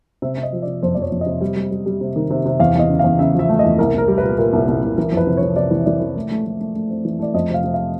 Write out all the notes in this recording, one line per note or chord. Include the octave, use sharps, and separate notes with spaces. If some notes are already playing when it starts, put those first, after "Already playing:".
C3 E5
C3
D#5
F3
C3 D5
F2 C5
F2 D5
C#5
F2
D#5
C3
G3
G3
G3
G3
C3
D#3
C3
C3
E2 F5
E2 D#5
C#3
E2 F5
C#3 E5
F3 E5
A3
E2 D#5
C2 A#4
C2 A#4
G3
B4
A#2
A#2 A#4
C2
C2
C2
E3 A#4
F2
B4
C3
C3 C#5
C3 D5
E3
E3 D5
E3
A3
A3
A3
A3
A3
C4
E3
A3 D5
F2 D#5
C3 F5
C3
F5